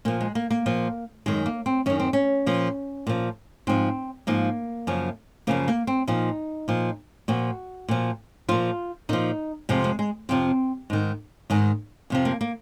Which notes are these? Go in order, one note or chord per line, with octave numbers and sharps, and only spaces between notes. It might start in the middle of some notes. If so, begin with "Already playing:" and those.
A#2 F3 A#3
G#3
A#3
A#3
A#2 F3
F#2 D#3 G#3
A#3
C4
F#2 D#3 C#4
C4
C#4
A#2 F3
A#2 F3
G#2 F3 C4
G#2 F3 A#3
F#2 C#3 F3
F#2 C#3 F3 A#3
A#3
C4
A#2 F3 D#4
A#2 F3
A#2 F3 F#4
A#2 F3
A#2 F3 F4
A#2 F3 D#4
F2 C3 F3 G#3
G#3
G#3
F2 C3 F3 C4
G#2 D#3
G#2 D#3
F2 C3 F3
A#3
A#3